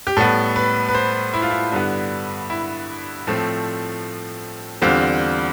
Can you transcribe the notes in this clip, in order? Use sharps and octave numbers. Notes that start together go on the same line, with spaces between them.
G4
A2 G3 B3 A4
B4
B4
C5
E4
F4
E4
G2 D3 G3 B3
E4
A2 F3 A3 C4
E2 D3 G3 C4 F4